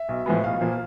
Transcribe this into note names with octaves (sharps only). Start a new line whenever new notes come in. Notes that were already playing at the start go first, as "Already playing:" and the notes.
Already playing: E5
B1
A2 F3 G#3 B3
B1 F5
A#2 F3 A#3